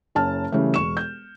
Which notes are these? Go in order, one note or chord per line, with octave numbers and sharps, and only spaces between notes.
F#1 C#4 A5 F6
C#3 E3 G3 A3
E1 C#6 E7
G6